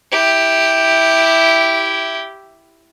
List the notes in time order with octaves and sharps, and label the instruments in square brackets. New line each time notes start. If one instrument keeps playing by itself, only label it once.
[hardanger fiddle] E4 G4